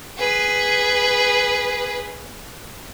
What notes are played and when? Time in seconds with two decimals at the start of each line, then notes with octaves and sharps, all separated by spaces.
0.18 G#4 B4